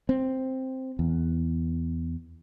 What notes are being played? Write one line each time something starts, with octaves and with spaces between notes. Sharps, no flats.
C4
E2